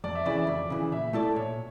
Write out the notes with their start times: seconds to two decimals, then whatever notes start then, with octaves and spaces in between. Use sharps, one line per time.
0.04 F2 D5
0.15 E5
0.25 C#3 E3 D5
0.37 E5
0.47 F2 D5
0.70 C#3 E3
0.92 A#2 E5
1.13 A3 E4 A4 D5
1.36 A#2 C#5